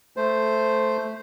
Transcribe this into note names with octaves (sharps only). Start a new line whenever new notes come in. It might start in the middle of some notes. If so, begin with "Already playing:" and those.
A3 C5